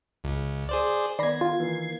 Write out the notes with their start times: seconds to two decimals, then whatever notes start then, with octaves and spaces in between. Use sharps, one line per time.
0.24 C#2
0.69 G#4 C5 D5
1.19 D#3 B3 D5 B5 G#6 A#6 C7
1.41 F4
1.60 D#3 E3 A#3